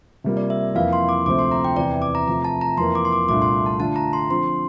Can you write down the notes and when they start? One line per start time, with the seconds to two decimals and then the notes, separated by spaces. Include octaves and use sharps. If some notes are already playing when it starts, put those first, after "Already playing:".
0.24 C3 G3 A#3 F4
0.37 D5
0.50 E5
0.75 F2 E3 A#3 E4 F5
0.93 C6
1.09 D6
1.26 D2 C3 F3 A3 C4 D6
1.39 C6
1.51 A#5
1.65 G5
1.76 E2 C3 E3 D5
2.02 D6
2.15 A#5
2.27 C3 F3 A3 A#5
2.44 A5
2.61 A#5
2.78 F2 E3 A#3 C6
2.95 D6
3.05 C6
3.12 D6
3.29 C2 A#2 A3 D4 F4 D6
3.42 C6
3.66 A5
3.79 D3 A3 D4 F4 A5
3.96 A#5
4.13 C6
4.30 D3 F3 C4 C6